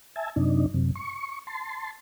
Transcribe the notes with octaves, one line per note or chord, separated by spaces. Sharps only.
E5 G#5 A5
F#2 C3 D4 D#4
F#2 C3
C#6
A5 C6